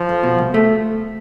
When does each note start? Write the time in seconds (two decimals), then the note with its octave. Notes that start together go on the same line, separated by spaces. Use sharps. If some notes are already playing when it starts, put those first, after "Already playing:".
Already playing: F3
0.09 F2
0.23 B2
0.38 C2
0.54 A3